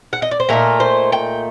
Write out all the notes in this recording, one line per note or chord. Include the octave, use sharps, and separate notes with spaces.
F#5
D#5
D5
C5
A#2 A3 D#4 A#4
C5
G5